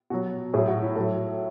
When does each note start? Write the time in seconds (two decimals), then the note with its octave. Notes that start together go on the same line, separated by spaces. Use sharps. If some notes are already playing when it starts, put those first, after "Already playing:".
0.10 B2 F#3 F#4
0.53 A2 F#3 G#4
0.68 F#4
0.82 E4
0.96 A2 F#3 A4